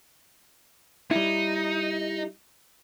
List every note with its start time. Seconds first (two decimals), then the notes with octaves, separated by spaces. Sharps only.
1.11 G3 D#4 E4